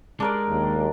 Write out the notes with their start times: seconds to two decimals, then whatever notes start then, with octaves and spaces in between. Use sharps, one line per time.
0.20 G#3 D4 A#4 D5
0.50 D#2